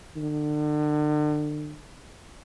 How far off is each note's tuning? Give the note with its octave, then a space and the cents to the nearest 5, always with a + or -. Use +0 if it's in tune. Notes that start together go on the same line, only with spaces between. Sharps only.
D3 +40